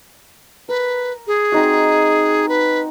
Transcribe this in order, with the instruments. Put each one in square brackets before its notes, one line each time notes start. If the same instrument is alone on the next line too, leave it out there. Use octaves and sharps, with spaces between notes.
[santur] A#4 [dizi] B4
[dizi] G#4
[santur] C4 D#4 F#4
[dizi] B4